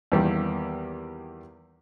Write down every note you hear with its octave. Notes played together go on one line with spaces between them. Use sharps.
E2 D#3 G3 A#3